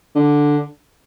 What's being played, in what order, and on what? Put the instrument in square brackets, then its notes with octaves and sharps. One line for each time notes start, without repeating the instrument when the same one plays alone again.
[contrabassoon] D3